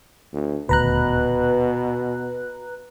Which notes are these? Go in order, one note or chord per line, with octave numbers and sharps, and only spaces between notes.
D2
D#1 D2 B2 B4 A#5 F#6